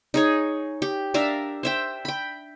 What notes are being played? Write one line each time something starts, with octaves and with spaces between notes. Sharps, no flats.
D#4 G#4 C#5
G4
D4 A#4 E5 F5
C5 E5 G5
G5 B5